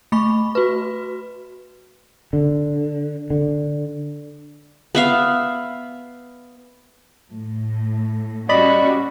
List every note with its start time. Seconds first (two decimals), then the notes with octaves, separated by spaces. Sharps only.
0.12 A3 B5 C#6
0.55 F#4 B4
2.33 D3
3.30 D3
4.95 B3 E5 F5
7.34 A2
8.49 G3 C#4 F#4 D5 D#5 B5